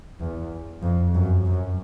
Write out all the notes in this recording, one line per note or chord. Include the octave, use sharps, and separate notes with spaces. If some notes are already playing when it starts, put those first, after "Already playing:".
E2
F2
F#2
F#2